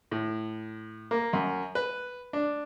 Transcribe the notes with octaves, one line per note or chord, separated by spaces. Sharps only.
A2
A#3
F#2
B4
D4